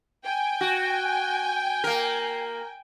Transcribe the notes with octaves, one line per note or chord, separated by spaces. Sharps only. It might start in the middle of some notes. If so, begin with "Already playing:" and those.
G5 G#5
F#4
A#3 A#4